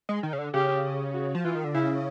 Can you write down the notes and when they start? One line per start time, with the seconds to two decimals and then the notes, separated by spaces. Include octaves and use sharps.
0.09 G#3
0.23 D#3
0.33 C#3
0.38 D3
0.54 C#3 G4
1.14 F#4
1.35 F3
1.44 E3 F4
1.55 D#3
1.64 D3
1.74 C#3 E4